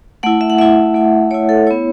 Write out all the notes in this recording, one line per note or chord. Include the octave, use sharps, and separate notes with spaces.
A3 E4 F#5
E5
F#5
A3 E4 E5
A3 E4
A3 E4 C#5
A4
B3 E4 C#5